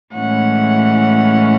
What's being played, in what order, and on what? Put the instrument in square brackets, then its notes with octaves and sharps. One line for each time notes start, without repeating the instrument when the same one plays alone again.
[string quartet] A2 E3 G#3 C#4 F#5